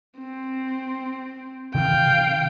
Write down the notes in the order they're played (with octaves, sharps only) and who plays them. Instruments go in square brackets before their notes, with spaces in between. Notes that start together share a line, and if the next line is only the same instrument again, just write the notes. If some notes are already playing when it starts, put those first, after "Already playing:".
[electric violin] C4
[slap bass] C3 D#3 E3 [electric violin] F5 G5